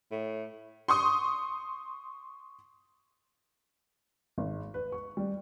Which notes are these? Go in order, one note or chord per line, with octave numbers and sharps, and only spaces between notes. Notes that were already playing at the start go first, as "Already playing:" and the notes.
A2
C6 C#6 D#6
G#1
B4
C#6
G3